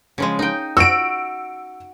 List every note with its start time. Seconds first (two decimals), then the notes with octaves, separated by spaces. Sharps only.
0.18 C#3 F3 G#3
0.39 D#4 G5
0.77 F#4 E6 D7